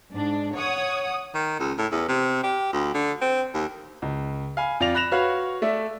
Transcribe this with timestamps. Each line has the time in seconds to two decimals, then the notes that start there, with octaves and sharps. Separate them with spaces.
0.12 G#2 D4
0.54 C#5 F#5 D#6
1.35 D#3
1.60 C#2
1.78 A2
1.92 E2
2.08 C3
2.44 G4
2.73 D2
2.94 D3
3.21 C4
3.54 D#2
4.02 C#2
4.57 F5 G#5 B5
4.80 F2 F4 D5 A#6 F7
4.94 B5 F#6 A#6 E7 F7
5.12 F#4 B4 C#5 F5 B5
5.62 A3 A4 D5 E5